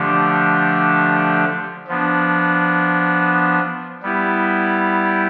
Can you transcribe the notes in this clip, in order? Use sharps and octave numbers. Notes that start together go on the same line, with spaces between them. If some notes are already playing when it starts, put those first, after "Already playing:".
Already playing: D3 F3 A3 D4 G4
F3 B3 D4
G3 B3 E4 G4